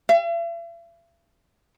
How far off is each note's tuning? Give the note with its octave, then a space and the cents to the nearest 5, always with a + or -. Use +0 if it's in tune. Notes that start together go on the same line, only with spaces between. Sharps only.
E5 +45